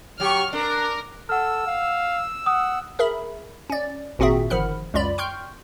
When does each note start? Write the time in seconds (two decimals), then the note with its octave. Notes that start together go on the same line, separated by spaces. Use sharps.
0.20 F#3 G4 C#6 F6
0.53 D4 A#4
1.29 A4 F#5 E6 F6
1.66 F5
2.46 F#5 D#6
2.99 G#4 A#4 E5 B5
3.70 C#4 D5
4.19 G#1 A#2 C4 F#4 G#4 E5
4.50 G1 D#3 F3 F#5 B5 F6
4.94 C#2 F#2 F4 D5 B5
5.18 G5 C6 C#6 F6 G6